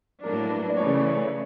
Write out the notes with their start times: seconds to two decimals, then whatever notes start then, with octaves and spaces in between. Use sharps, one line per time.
0.24 A2 F#3 A#3 D4 A#4
0.50 B4
0.70 D5
0.77 C#3 E3 A3 C#5